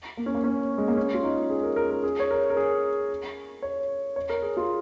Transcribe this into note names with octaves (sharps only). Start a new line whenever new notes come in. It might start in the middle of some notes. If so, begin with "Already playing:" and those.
A#3
C#4
A#3
C#4
G#3
A#3
C#4
F4
D#4
G#4
A#4
A#4
A#4
G#4
C#5
A#4
A#4
G#4
C#5
C#5
A#4
G#4
F4